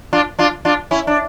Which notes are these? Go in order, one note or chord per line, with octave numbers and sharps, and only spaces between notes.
D4 F4
D4 F4
D4 F4
C#4 E4
D4